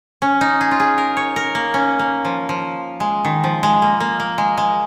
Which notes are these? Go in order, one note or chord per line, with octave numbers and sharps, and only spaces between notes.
C#4
D#4
G#4
F4
G#4
A#4
C#5
A#4
A#3
C#4
A#3
F3
F3
G#3
D#3
F3
G#3
A#3
A#3
A#3
G#3
G#3